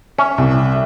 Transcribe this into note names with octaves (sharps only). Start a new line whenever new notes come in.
C#4 E5
C2